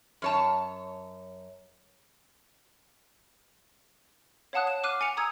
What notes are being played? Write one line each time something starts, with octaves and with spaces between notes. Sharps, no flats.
F#2 C#5 A5
C#5 F5 F#5 A5 D#6 F#6
E7
D6 F6 F#6 C7 D#7
G#5 C#7 F7
A#5 D#6 E6 G#6